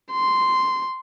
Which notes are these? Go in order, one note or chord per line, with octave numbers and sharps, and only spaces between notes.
C6